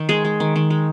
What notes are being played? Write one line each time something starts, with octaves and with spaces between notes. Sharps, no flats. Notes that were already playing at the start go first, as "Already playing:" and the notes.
Already playing: D#3
G#3 G#4
G#3
D#3
D#3
G#3